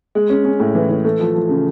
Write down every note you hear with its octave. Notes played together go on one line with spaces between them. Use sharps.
G#3
C#4
C#4
A2
E3
E3
A3
F3
F3
C#3